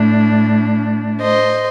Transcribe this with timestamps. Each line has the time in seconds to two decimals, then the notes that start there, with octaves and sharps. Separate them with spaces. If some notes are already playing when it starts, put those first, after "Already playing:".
Already playing: A2 A3 D4
1.22 C5 D#5